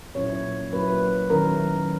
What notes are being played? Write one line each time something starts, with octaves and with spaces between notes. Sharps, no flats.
A#2 F#3 C#4 E4 C#5
F#3 A#3 E4 B4
D#3 F#3 C#4 E4 A#4